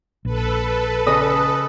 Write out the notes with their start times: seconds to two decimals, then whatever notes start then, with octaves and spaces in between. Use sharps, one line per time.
0.25 A#1 A4 B4
1.07 C#3 D#5 D#6